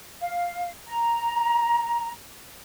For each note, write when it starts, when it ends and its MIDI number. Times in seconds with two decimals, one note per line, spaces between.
0.22 0.70 77
0.86 2.11 82